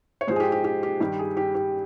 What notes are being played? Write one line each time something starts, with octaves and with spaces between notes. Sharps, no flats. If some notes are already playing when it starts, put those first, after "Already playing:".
C#5
G#2 F3 G#3 C5
G#4
G4
G4
G4
G4
G2 D#3 G3 G4
G#4
G4
G4